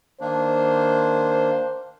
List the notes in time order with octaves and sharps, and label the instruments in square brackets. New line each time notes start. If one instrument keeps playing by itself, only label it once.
[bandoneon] D#3 A#3 D4 [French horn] C5